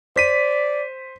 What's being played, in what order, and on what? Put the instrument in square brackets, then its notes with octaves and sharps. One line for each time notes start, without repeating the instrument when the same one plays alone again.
[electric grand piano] C5 B6 D#7 [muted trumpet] D5